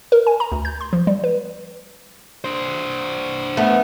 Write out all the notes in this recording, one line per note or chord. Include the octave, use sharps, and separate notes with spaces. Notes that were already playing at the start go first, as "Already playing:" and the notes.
A#4
G#5
A#5
D2
G6
C6
F3
G3
B4
D4 C5
A3 B3